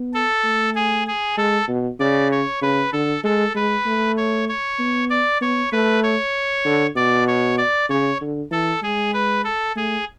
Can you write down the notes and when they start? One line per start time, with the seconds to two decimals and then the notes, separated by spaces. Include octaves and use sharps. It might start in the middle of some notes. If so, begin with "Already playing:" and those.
Already playing: B3
0.14 A4
0.44 A3
0.75 G#4
1.07 G#4
1.37 G#3 A4
1.68 B2
2.00 C#3 D5
2.31 C#5
2.62 C#3 B4
2.92 D3 A4
3.24 G#3 A4
3.55 G#3 B4
3.86 A3
4.17 C#5
4.49 C#5
4.79 B3
5.10 D5
5.41 B3 C#5
5.72 A3 B4
6.03 C#5
6.65 D3
6.96 B2 D5
7.27 C#5
7.58 D5
7.89 C#3 C#5
8.21 D3
8.51 E3 A4
8.82 G#3 G#4
9.13 B4
9.44 A4
9.76 A3 G#4